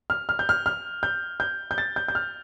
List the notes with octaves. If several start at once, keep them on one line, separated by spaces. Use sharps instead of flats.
F6
F6
G6
F6
F6
G6
G6
G6
A6
G6
G6
F6